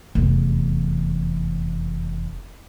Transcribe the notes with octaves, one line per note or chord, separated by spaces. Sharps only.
F1 E2